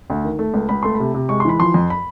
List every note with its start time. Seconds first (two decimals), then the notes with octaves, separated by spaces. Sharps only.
0.10 D2
0.24 D#3
0.39 A3
0.54 C#2
0.69 C#2 B5
0.83 A3 C6
0.95 B5
1.00 C3
1.14 C3
1.29 G#3 C#6
1.40 C6
1.45 E3 B5
1.60 F3 C6
1.74 F2
1.90 B5